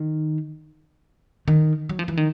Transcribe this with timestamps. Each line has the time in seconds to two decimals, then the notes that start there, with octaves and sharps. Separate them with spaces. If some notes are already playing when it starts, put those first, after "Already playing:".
Already playing: D#3
1.48 D#3
1.89 F#3
1.99 F3
2.08 E3
2.17 D#3